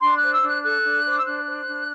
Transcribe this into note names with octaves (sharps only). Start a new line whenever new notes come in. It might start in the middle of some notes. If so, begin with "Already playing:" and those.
D4 C6
C5 F#6
E6
D4
F#6
A4 F#6
D4
C5
D6
E6
D4 F#6
C5
D4